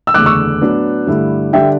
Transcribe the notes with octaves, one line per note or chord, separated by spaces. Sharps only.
E6
F#1 E2 D3 A3 D6 F#6
C#6 E6
A2 F#3 B3 D4
G2 D3 A3 E4
D3 G3 D4 E5 G5